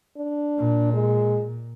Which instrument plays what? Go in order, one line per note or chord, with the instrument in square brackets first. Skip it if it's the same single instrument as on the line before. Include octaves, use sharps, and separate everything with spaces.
[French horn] D4
[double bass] A#2
[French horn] G#3